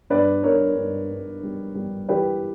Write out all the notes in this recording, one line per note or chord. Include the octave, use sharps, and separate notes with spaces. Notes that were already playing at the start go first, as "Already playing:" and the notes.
G2 B4 D5
G2 A#4 C#5
G2
G2
G3
G3
E3 G4 B4